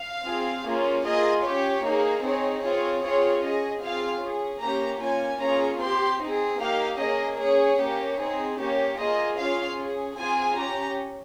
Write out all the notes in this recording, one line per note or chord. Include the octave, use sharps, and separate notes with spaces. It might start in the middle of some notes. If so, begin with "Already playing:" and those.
Already playing: F5
C4 F4 G#4
A#3 C#4 F4 G#4
A#3 F4 G#4 D#5
C#4 G4 C#5
A#3 D#4 G#4
C4 D#4 G#4 C#5
C4 F4 G#4 C#5
C4 F4 G#4 C#5
C#4 G#4 D#5
C4 F4 G#4 F5
C#4 G#4
A#3 C#4 G4 A#5
A#3 C#4 F4 G#5
A#3 C#4 F4 G#4 A#5
C4 G4 C6
C4 D#4 G#4
A#3 D#4 G4 F5
A#3 C#4 G#4 D#5
C#4 G#4 C#5
A#3 C#4 G4
C4 D#4 G#4
A#3 C#4 G4 C#5
A#3 F4 G#4 D#5
C#4 F4 G#4 F5
C#4 G#4
C4 F4 G#4 G#5
C#4 G4 A#5